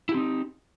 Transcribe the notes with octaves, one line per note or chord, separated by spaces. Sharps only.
C4 D#4 E4 G4